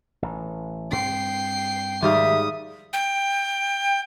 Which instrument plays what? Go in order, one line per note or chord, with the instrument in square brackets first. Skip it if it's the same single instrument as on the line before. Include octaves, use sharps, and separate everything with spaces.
[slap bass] A1
[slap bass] G2 C4 [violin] G5 C7
[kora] G#2 G3 F5 [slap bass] D#3 F3 A3 [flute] E5 [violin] D#6
[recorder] G5